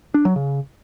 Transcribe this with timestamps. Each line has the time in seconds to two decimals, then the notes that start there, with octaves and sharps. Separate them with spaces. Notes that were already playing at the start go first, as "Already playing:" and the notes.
0.14 D4
0.25 F#3
0.36 C#3